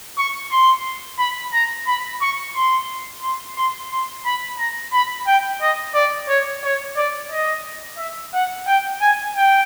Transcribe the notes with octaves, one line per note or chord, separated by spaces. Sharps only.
C#6
C6
B5
A#5
B5
C#6
C6
C6
C6
C6
B5
A#5
B5
G5
D#5
D5
C#5
C#5
D5
D#5
E5
F#5
G5
G#5
G5